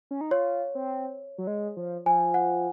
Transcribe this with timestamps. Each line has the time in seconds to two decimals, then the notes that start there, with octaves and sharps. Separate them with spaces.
0.11 C#4
0.21 D#4
0.31 F4 C#5
0.75 C4
1.38 F#3
1.47 G#3
1.77 F3
2.06 F3 G#5
2.34 F#5